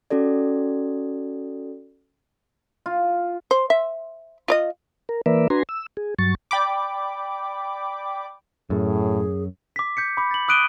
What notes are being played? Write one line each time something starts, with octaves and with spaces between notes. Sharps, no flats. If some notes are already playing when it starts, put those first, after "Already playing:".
C#4 F#4 A4 D5
F4
C5
E5
F4 D5 D#5
A#4
E3 A#3 A#4 B4 D5 E5
D4 F#4 B4 G#5 A#5 C6
E6
G#4
G2 F#3 C#6 A6
D5 G5 B5 D6
F#2 A2 G#4
D6 B6
G6 B6 C#7
B5 D6
A6 F#7
D6 D#6 F#6 D7 D#7 G7